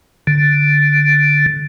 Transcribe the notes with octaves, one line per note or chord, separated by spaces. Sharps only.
D3